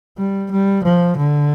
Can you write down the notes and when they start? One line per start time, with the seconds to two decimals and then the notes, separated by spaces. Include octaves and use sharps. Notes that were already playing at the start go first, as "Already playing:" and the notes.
0.18 G3
0.51 G3
0.84 F3
1.17 D3